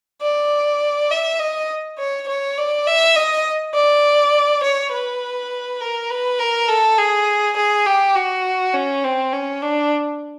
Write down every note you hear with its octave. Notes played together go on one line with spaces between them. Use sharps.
D5
E5
D#5
C#5
C#5
D5
E5
D#5
D5
C#5
B4
A#4
B4
A#4
A4
G#4
G#4
G4
F#4
C#4
C4
C#4
D4